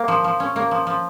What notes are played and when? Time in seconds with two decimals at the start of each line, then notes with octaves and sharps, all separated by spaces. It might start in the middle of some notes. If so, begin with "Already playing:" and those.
Already playing: A#3
0.08 F3
0.24 F3
0.40 C#4
0.56 A#3
0.71 F3
0.87 F3